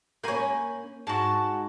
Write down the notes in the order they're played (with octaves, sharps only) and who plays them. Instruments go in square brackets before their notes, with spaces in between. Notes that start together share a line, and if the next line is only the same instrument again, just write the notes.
[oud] A#3 C#4 [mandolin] G#5 B5 G6
[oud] G#2 [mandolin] F#4 A5